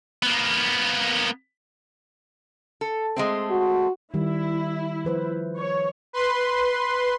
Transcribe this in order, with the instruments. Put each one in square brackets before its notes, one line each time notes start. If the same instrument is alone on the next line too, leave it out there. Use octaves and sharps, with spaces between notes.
[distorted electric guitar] A#3 B3
[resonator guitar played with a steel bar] A4
G#3 A3 C4
[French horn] F#4
[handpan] D#3 G3 D#4 [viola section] E4
[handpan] F3 B4 C5
[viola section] C#5
[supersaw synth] B4 C6